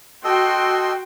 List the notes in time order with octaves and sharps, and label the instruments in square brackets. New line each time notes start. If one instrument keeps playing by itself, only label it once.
[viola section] F#4 G5 C6 [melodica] A4 D#5 E6